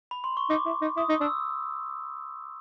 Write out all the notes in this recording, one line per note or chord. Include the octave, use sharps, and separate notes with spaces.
B5
C6
C#6
D#4 D6
E4
D#4
E4 D#6
D#4
D4 E6